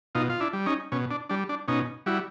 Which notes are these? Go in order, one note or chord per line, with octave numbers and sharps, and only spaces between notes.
B2 D#4 F4
F4
D4 E4
G3
C#4 D#4
B2 C#4
D4
G3 D4
D4
B2 C#4 D#4
G3 E4 F#4